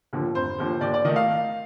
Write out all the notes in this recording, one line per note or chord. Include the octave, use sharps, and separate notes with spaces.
D#2 D3 F3
F1 C5
D#2 D3 F3
D#2 D5
D5
D#3 A3 D#5
F5